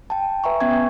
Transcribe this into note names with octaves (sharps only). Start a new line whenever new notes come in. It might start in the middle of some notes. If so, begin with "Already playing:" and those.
G5 A5
B4 E5 G#5 A#5 C#6
B3 C#4 E5 G5 C#6 G#6